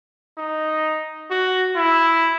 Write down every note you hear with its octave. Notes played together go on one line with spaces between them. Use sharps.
D#4
F#4
E4